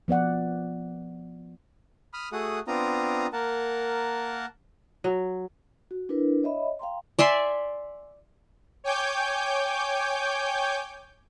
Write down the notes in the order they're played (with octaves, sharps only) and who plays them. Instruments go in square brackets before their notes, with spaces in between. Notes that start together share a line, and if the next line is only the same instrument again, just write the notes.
[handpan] F3 B3 D5 F#5
[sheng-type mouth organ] B5 D#6 F6
A3 F#4 G#4 F#5 D#6
B3 C4 D4 F4 A#5 D#6
A#3 A#4 F#5 A5
[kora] F#3
[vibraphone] F#4
D4 E4 A#4 B4
C#5 D#5 E5 B5
F5 G5 A#5 C6
[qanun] D5 E5 G#5 C6
[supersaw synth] C#5 G5 G#5 D6 G6